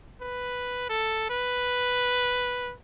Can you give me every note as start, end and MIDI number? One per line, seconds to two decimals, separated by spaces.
0.21 0.87 71
0.89 1.25 69
1.30 2.73 71